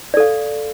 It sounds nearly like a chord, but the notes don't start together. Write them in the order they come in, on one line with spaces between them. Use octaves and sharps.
D5 A4 F5